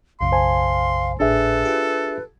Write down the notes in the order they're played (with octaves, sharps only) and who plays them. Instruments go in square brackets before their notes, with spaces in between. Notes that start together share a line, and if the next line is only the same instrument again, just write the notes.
[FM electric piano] B1 F#2 C#3 [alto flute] F5 [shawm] C6
[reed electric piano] C5 G#5 A5
[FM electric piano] G#1 A2 [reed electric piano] D4 G#4 E5 [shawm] A4 [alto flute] B4
[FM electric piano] F4 G4